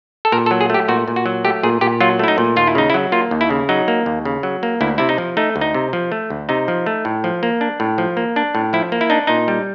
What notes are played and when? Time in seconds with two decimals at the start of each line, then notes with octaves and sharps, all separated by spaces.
0.25 A4
0.32 A#2 A#4
0.46 A4
0.51 F#3
0.61 G#4
0.70 A3 G4
0.88 A#2 F#4
1.08 A#2
1.16 F#4
1.26 F#3
1.45 A3 G4
1.63 A#2 G#4
1.81 A#2 G4
2.00 F#3 F4
2.19 A3 E4
2.28 D#4
2.38 A#2
2.56 D#2 F4
2.67 E4
2.75 C#3 D#4
2.90 E4
2.94 F#3
3.12 A#3 F4
3.31 D#2
3.41 E4
3.50 C#3
3.69 F#3 D#4
3.88 A#3
4.06 D#2
4.25 C#3
4.43 F#3
4.63 A#3
4.81 D2 E4
4.98 C3 E4
5.09 D#4
5.18 F3
5.37 A3 D#4
5.56 D2
5.61 D#4
5.74 C3
5.93 F3
6.12 A3
6.30 D2
6.49 C3 D#4
6.68 F3
6.86 A3
7.05 A2
7.24 F3
7.43 A#3
7.61 D4
7.80 A2
7.98 F3
8.17 A#3
8.36 D4
8.55 A2
8.73 F3 E4
8.92 A#3
9.01 E4
9.10 D4 D#4
9.27 A#2 D#4
9.48 G3